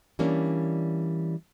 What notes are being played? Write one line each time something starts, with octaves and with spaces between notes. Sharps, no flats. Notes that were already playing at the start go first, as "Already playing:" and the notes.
E3 G3 A#3 C#4 D4